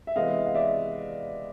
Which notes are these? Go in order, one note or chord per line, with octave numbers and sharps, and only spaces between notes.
E5
C3 E3 G#3 B3 D#5 F5
F5
D5 E5